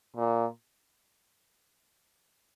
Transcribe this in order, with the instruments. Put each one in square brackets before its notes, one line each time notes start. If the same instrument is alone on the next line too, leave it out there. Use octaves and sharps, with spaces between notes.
[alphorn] A#2